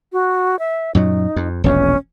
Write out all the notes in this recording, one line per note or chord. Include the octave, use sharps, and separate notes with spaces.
F#4
E5
F#2 A#2 F#3 D#4
F2
E1 A#1 E2 C#4